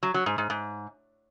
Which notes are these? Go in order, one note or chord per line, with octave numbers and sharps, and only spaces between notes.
F#3
F#3
G#2
G#2
G#2